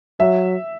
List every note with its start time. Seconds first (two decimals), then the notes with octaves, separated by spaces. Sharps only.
0.20 F#3 E5